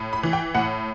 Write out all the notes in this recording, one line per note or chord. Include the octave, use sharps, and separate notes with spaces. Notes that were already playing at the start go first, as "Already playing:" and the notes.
Already playing: A2
B5
E3
G5
A2 F#5